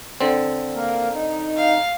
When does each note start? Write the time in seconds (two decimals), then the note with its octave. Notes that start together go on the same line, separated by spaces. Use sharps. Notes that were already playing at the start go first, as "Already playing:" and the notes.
0.21 D3 C4
0.75 A#3 A#4
1.13 D#4
1.57 F5